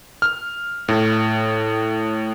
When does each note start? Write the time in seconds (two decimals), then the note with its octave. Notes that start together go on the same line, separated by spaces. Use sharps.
0.22 F6
0.88 A2